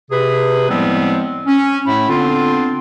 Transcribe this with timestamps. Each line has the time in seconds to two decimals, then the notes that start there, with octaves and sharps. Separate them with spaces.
0.11 C3 G#4 B4
0.70 A2 F3 G3 G#3 B3 C4
1.47 C#4
1.87 A2 A3 E4
2.09 D3 B3 C4 D4 F4